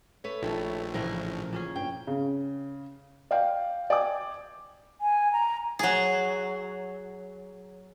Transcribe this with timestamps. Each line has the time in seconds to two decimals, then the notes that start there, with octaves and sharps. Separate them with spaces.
0.24 A3 B4 C#5
0.43 A#1 A#2 D#3 E4 A4
0.94 A2 C#3 E3 F3 A#4
1.53 A#2 C#4 G#4
1.76 G2 G5
2.07 C#3
3.31 D5 F5 G5
3.90 D5 G5 G#5 D6
5.01 G#5
5.33 A#5
5.79 F#3 G#4